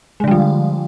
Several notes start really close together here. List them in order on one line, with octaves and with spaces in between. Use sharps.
G#3 D3 G3 F3